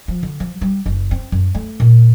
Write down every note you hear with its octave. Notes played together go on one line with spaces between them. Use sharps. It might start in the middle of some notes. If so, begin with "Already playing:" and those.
F3
D3
F3
G3
F#1
C4
F#2
A3
A#2